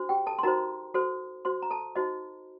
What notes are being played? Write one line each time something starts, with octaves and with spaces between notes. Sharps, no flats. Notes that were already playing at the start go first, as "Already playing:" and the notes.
Already playing: D4 F#4 C5
G4 G5
A4 A5
C6
D#4 F#4 A#4 C5 A#5
F#4 A4 C5
F#4 C5 C6
A#5
A4 A5
D#4 F#4 C5 D#5